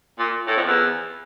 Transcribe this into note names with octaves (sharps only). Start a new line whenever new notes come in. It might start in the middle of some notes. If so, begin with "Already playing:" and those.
A#2
A2
F2
E2